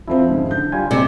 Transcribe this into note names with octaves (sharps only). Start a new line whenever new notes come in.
F2 F3 C4 E4
G#2 C#3
D3 G6
G3 F4 G#5
C3 G#3 D5